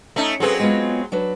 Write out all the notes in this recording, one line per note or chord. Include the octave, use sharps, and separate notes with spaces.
A3 C#4 D#4
F#3 C4 G#4 A4 B4 F5
G#3 B3 F4
F#3 D4 B4